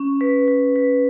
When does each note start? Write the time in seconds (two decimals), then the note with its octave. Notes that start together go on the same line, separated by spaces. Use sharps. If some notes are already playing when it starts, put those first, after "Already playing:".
Already playing: C#4
0.21 B4
0.48 B4
0.76 B4